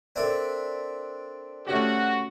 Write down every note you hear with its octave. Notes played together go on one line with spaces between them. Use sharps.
C4 D4 A4 A#4 D5 E5
A3 C#4 F#4 G4